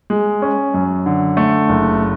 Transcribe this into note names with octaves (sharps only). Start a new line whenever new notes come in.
G#3
C#4
F#2
D3
A3
F#1